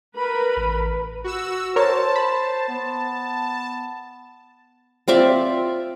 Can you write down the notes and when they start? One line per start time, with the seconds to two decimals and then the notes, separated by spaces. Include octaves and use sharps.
0.15 A#4 B4 B5
0.57 A1
1.24 F#4 E6
1.76 A#4 C5 C#5 A5
2.16 B5
2.69 B3
5.08 C4 F4 D5 E5